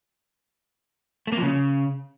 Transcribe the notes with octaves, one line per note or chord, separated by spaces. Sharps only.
A3
A#3
F3
C#3